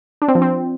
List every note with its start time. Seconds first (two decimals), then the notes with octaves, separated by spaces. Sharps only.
0.22 D4
0.28 C4
0.35 F3
0.42 C4